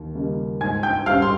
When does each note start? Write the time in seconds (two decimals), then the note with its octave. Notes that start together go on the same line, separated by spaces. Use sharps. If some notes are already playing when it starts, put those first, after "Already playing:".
Already playing: D#2
0.15 C#3 G3 A#3 D#4
0.60 G#2 G#5 G#6
0.83 G5 G6
1.06 G3 C#4 F5 F6
1.22 C6